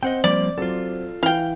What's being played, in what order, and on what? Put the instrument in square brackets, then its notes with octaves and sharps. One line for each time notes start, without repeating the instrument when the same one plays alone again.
[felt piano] C4 [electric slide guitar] D#5 F#5 G5
[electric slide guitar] F3 G3 A#3 [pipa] D5
[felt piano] F#3 C4 [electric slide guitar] F4 A4
[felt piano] E3 [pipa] F5 G5